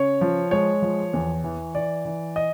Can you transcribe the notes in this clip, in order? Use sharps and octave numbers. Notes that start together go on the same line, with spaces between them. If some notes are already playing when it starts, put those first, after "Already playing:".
Already playing: C#3 C#5
F3
G#3 C#5
F3
E2
E3
E3 D5
E3
D#5